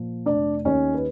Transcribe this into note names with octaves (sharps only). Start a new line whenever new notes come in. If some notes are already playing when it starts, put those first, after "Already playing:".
Already playing: A#2 F3
F1 D4 D5
D#2 D#3 C#4 C#5
B4